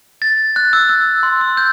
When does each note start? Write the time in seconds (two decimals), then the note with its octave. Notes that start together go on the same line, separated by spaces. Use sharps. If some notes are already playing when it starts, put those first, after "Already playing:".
0.22 A6
0.56 F#6
0.73 E6
0.89 E6
1.23 C6
1.41 E6
1.57 G6